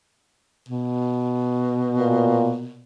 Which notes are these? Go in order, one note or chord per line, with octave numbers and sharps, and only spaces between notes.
B2
A#2